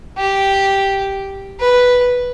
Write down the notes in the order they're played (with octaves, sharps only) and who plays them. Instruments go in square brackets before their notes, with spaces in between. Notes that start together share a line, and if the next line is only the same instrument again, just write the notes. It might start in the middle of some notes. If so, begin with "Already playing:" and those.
[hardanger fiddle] G4
B4